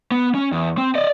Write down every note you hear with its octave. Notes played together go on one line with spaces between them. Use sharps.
B3
C#4
E2
C4
D5 D#5